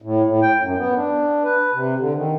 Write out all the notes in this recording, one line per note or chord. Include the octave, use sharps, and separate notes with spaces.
A2
A2
G5
F#2
B3
D4
B4
C3
D3
D#3